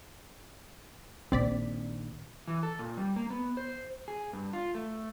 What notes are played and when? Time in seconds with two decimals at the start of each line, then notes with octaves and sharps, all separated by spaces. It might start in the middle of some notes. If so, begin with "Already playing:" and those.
1.32 A#1 D#3 C4 D5 B6
2.48 E3
2.63 A4
2.79 A#2
2.97 G3
3.16 A#3
3.30 B3
3.57 C5
4.08 G#4
4.33 G2
4.53 F4
4.75 A3